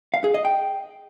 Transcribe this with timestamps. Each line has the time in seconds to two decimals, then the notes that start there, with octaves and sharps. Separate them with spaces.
0.14 F5
0.24 G#4
0.34 D#5
0.45 G5